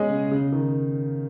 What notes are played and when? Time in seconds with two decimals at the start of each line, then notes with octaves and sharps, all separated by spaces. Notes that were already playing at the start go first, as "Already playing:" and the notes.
Already playing: B2 G#3 C#4 G#4 D#5
0.10 C#3
0.31 C#3
0.52 D#3